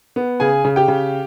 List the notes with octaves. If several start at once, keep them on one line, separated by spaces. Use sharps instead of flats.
B3
C#3 G#4 G#5
C#3
G4 G5
C#3